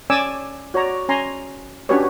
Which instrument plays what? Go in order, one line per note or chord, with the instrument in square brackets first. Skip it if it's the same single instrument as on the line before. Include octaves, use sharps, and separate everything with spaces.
[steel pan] C#4 D5 G#5 D6 E6
F#4 C#5 D5 A#5
C#4 G#5 A#5 C6
C#4 D4 F#4 G4 B4 C#5